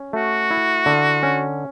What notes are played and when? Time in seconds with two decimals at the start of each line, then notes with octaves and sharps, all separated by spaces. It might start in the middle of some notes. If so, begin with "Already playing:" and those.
Already playing: C#4
0.13 A3 F#4
0.51 E4
0.86 D3
1.23 C#4